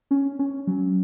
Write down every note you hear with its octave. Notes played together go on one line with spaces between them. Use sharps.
C#4
C#4
F#3